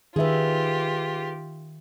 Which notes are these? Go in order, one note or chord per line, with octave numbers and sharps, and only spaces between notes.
D#3 F4 G4 G#4 B4 E5